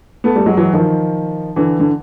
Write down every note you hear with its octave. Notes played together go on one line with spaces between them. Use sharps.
A3 B3
G3 A3
F#3 G#3
E3 F#3
D#3 F3
D3 E3
D3